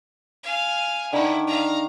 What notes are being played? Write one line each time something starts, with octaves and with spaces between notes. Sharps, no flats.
F5 G#5
D3 D#3 E4
F5 A#5